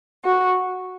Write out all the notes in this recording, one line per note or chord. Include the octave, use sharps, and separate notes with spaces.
F#4